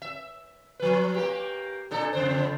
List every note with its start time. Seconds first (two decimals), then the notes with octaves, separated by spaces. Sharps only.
0.02 E5
0.80 F3 B4
1.15 A#3 G4
1.91 A#2 D4 A4
2.13 F2 C#3 C5